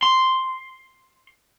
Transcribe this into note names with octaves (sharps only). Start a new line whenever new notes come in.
C6